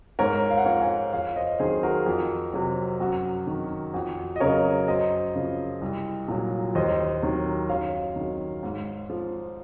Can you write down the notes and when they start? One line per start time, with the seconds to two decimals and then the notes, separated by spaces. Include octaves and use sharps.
0.19 G#2 A#4 C#5
0.50 F5
0.58 F#5
0.65 F3 C#5 F5
0.81 F5 G#5
1.13 F2 C#5 F5
1.36 C5 D#5
1.59 D#3 F#3 G#4 C5
1.83 F#4 A#4
2.06 F2
2.53 C3 F#3
3.00 F#2 F#4
3.47 D#3 F#3
3.94 F2 F#4
4.36 D#5
4.40 C#3 F#3 A#4 C#5
4.88 F#2 C5 D#5
5.35 C#3 F3
5.81 C2
6.28 A#2 F#3
6.75 D#2 C5 D#5
7.22 D#3 F#3
7.69 F#2 C#5 F5
8.16 D#3 F#3
8.63 G#2
9.10 F3